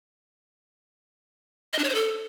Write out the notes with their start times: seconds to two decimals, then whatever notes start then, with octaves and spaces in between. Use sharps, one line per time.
1.73 D#5
1.79 D4
1.84 C#5
1.89 C5
1.95 A4